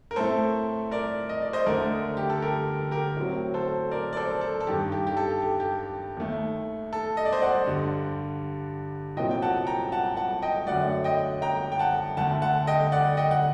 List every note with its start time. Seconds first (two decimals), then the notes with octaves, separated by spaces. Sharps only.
0.11 A#4
0.16 A2 A3 C4 A4 C5
0.91 A#4 D5
1.29 D#5
1.42 D5
1.53 C5 D#5
1.66 D2 D3 A3 A#4 D5
2.17 G4
2.30 A4
2.42 G4 A#4
2.91 G4 A#4
3.17 A2 F#3 C4
3.54 A4 C5
3.91 A#4 D5
4.13 D5
4.17 A4 C5
4.41 A4
4.60 A4
4.67 G2 D#3 G3 G4
4.92 G4
5.07 G4
5.17 A4
5.42 G4
5.60 G4
6.17 D#2 D#3 A3
6.93 A4
7.17 D#5
7.25 D5
7.33 C5 D#5
7.41 D5 F#5
7.67 G2 D3 G3
9.17 C2 A#2 F#3 C4 D#5 G5
9.31 G5
9.42 F#5 A5
9.67 G5 A#5
9.92 F#5 A5
10.17 F#5 A5
10.42 D#5 G5
10.67 F#2 D3 F#3 A3 D5 F#5
11.04 D#5 G5
11.42 G5 A#5
11.72 G5
11.79 F#5 A5
12.17 D2 D3 A3 F#5 A5
12.42 F#5 A5
12.67 D#5 G5
12.92 D5 F#5
13.17 D#5 G5
13.31 F#5